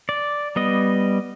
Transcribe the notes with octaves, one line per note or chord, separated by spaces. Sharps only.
D5
G3 B3 D#5